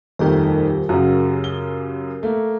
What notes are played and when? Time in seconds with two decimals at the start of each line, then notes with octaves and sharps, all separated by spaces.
0.19 D#1 F2 D#3 A3 G4 A#4
0.89 F#2 C#3 F#4
1.44 G7
2.23 A3 A#3